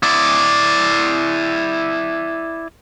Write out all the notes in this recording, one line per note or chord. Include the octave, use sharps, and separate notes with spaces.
E4 D5